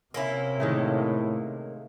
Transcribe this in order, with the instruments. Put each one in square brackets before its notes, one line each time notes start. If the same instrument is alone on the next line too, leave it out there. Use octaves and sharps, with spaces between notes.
[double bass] C3 [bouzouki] A#3 C#4 E4
[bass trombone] A2 [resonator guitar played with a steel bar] D#3 G#3 A3